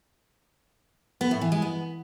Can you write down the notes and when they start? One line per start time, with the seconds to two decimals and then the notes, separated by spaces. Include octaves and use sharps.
1.21 B3
1.31 A2
1.41 E3
1.52 G#3
1.62 B3